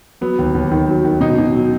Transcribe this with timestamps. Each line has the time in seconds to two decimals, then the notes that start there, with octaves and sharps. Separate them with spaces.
0.21 F#3 B3
0.39 D#2
0.55 D#2
0.72 D#3
0.88 F#3
1.04 D#3
1.21 B2 D#4
1.38 B2
1.54 F#3